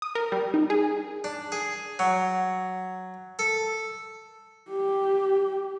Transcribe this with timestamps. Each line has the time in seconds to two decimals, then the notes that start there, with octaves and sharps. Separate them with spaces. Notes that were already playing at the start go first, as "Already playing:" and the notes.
0.02 D#6
0.15 A#4
0.32 G3
0.54 D#4
0.70 G#4
1.24 D4
1.52 G#4
1.99 F#3
3.39 A4
4.70 G4